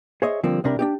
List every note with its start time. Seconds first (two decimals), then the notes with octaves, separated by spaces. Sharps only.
0.22 G#4 C5 C#5 D#5 E5
0.43 D3 F3 G3 A#3 C4
0.64 C2 C3 D4 A#4 B5
0.79 D4 D#4 G4